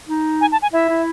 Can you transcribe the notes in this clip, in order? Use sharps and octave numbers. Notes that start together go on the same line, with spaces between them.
D#4
G#5
A5
G#5
E4 E5
E4